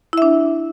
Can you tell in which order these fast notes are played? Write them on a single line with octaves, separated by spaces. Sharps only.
E4 E5 D4